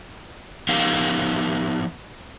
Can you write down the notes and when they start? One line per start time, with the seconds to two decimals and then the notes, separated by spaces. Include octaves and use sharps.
0.69 F3 B3 D#4 G4 A#4 F5